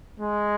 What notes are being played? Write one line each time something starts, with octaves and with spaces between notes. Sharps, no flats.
G#3